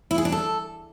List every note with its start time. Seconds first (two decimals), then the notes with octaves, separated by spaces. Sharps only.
0.11 E4
0.18 G#4
0.25 D4
0.32 A4